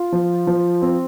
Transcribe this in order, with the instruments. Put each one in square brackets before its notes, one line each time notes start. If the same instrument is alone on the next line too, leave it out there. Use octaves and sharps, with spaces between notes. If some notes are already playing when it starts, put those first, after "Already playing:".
Already playing: [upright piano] F4
F3
F3
C4